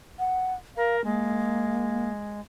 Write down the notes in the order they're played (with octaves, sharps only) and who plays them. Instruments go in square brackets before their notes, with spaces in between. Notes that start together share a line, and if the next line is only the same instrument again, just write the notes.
[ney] F#5
[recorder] A#4 [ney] F5
[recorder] G#3 [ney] A#3